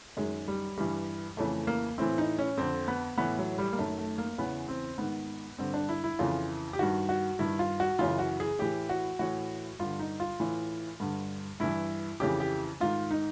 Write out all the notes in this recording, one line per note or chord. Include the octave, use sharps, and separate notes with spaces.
F#2 D#3 G#3
G3
G2 E3 G3
F2 C#3 E3 A3
A#3
A2 E3 C4
D#4
C#4
F2 D3 C4
B3
A2 E3 B3
F#3
G3
A#3
F#2 D#3 A3
A3
A#3
E2 C#3 E3 B3
C4
G#2 D#3 B3
G2 D3 C4
D4
E4
E4
F2 C#3 E3 F4
G4
G2 D#3 F#4
F#4
G2 D#3 E4
F4
F#4
F#2 C#3 E3 F4
F#4
G#4
A2 E3 G4
F#4
A2 E3 F#4
G2 D3 F4
D#4
F4
A2 E3
G2 D3
G2 E3 E4
F2 C#3 E3 G4
G4
G#2 D#3 F4
D#4